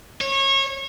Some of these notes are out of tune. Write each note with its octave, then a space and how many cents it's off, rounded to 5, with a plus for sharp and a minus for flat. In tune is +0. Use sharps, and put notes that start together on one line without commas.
C#5 -25